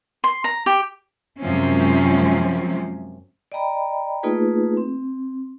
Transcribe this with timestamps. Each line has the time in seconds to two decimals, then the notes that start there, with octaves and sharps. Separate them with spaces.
0.24 C6
0.44 A#5
0.66 G4
1.40 F#2 C3 F3 G#3 C4 C#4
3.52 D5 D#5 G5 A#5 B5
4.23 A3 A#3 D#4 F4 G#4 B4
4.77 C4